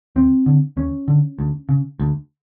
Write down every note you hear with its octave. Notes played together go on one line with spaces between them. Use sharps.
D#2 C4
D3
D#2 C#4
D3
D2
C#3
D2